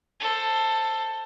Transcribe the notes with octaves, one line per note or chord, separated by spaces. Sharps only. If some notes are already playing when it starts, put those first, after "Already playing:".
A4 C5